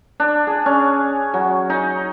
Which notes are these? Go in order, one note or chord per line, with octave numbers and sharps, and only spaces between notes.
D4
G#4
C#4
F#3
D#4